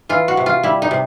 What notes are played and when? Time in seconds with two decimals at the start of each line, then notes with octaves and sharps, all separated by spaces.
0.09 E3 F4
0.28 F#4
0.37 C3
0.46 F4
0.63 G3 E4
0.82 D#4
0.91 C3